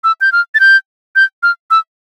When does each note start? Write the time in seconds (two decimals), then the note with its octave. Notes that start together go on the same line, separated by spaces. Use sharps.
0.04 E6
0.21 G6
0.32 F6
0.55 A6
0.60 G6
1.16 G6
1.43 F6
1.71 E6